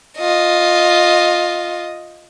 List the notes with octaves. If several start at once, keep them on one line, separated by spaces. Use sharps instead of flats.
F4 D#5